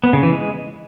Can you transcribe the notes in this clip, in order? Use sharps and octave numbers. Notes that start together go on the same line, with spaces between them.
B3
C#3
E3
G#3